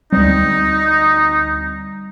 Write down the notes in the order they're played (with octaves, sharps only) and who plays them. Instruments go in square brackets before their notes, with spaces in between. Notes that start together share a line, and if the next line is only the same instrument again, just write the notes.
[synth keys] D2 C4 [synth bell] G3 [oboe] D#4